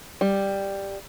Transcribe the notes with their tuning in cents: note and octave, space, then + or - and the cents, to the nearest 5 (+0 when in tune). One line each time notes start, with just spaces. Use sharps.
G3 +5